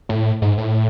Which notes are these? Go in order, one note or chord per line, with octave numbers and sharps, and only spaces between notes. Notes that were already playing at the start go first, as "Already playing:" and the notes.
A2
G#2
A2